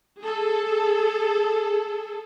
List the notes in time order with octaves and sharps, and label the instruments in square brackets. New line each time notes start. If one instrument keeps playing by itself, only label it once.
[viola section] G#4 A4